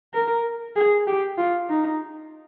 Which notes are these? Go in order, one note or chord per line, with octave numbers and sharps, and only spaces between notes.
A#4
G#4
G4
F4
D#4